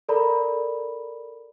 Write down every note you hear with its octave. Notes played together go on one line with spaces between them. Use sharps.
A4 A#4 D5 A#5 B5